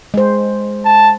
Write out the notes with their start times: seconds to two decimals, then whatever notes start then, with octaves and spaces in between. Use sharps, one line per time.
0.14 G#3 C5
0.85 A5